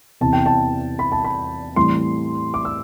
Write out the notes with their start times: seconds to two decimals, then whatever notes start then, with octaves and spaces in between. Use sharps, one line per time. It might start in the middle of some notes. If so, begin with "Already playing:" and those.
0.21 E2 C3 E3 A5
0.33 G5
0.46 A5
0.99 B5
1.12 A5
1.24 B5
1.76 A2 E3 G3 C4 C6
2.54 D6
2.65 E6